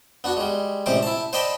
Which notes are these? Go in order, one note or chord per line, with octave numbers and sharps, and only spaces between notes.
B3 D4 F#4
G3 G#3
A1 C3 G#3 C5 D5 D6
E4 A5
C5 D5 D#5 G5 A5 B5